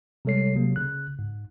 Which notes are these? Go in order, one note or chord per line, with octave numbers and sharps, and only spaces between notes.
C3 G3 G#3 A4 C#5 C7
C3 F#3 A#3
C#3 F#6
G#2